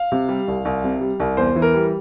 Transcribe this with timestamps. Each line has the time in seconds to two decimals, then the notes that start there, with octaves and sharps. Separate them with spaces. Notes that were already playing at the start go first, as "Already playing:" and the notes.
Already playing: F5
0.12 C3
0.29 G3
0.48 C2
0.65 C2
0.84 C3
1.01 G3
1.20 C2
1.37 E2 C5
1.56 E3
1.62 A#4
1.74 G3